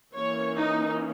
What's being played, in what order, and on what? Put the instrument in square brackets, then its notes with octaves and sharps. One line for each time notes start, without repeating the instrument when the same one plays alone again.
[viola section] E3 A#3 C#4 C#5
D#4